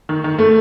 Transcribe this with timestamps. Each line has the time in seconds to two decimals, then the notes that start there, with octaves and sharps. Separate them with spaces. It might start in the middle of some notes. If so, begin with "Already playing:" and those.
0.09 D#3
0.24 D#3
0.38 A3